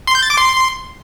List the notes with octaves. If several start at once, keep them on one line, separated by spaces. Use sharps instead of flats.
C6
G6
A6
D6
C6